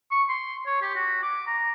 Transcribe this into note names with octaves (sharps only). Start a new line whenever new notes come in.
C#6
C6
C#5
G4
F#4
D6
A#5